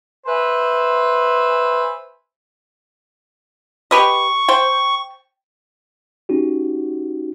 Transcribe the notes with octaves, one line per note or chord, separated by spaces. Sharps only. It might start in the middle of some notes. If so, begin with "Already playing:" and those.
B4 C5 E5 G#5
G4 B4 D#5 C#6
C5 G5
C#4 D#4 F#4 G4